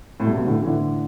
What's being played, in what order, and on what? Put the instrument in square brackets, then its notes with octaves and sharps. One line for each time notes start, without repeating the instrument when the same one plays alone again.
[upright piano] A2
G2 B2
G2 B2
A2 D3
E3
A2 D3